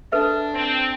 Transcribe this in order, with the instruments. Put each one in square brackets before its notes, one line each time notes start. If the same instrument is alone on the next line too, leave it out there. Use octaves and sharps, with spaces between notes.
[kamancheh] D4 [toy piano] A4 B4 E5
[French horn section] C4